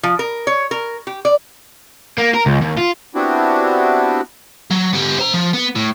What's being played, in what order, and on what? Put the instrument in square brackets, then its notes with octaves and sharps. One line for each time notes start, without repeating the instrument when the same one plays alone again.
[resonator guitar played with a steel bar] F3
A#4
C#5
A#4
G4
D5
[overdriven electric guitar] A#3
A#4
C#2
D#2
F4
[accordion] B3 C4 D4 E4 F#4 G4
[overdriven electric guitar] F#3
B3 G4
C5 A#5
F3
B3
A2